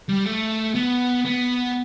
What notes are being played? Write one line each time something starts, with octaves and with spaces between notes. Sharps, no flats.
G3
A3
B3
B3